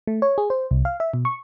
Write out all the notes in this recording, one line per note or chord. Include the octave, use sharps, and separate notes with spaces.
A3
C#5
G#4
C5
C2
F5
E5
B2
C#6